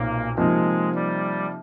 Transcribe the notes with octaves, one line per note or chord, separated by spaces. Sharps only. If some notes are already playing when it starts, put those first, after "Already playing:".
Already playing: B1 A#2 A#3 C4 D#4
C3 F3 G#3 A#3 D#4
G3